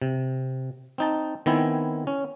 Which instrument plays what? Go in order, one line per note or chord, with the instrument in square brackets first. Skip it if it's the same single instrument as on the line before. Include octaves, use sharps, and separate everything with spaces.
[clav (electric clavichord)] C3
C4 D#4 A5
D#3 B3 C4 E4 G#5
C#4